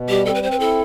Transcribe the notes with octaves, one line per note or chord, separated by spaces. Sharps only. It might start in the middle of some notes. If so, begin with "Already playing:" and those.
Already playing: B2
G3 G4
C4 A4
B4
C4 C5
B4
E4 A4